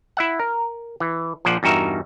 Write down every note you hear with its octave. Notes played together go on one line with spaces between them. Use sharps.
E4 E5 F#5
A#4
E3
A#1 F3 C5 D5 F#5
E2 G2 D#4 F#4 A#4 E5